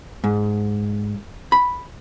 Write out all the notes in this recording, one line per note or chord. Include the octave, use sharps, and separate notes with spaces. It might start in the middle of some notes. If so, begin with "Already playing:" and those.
G#2
B5